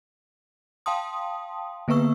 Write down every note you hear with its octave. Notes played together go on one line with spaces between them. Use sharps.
F5 G5 A5 C6 D#6
D3 A#3 B3 B4 C#6 E6